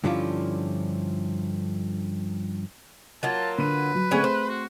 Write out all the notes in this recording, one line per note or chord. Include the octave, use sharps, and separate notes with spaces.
G2 D3 F3 C#4 E4 F4
F#3 A#3 F4 A5
D3 B4 D#7
F#3
D3 A3 C4 C#4 G#4 G#5
C5
F#4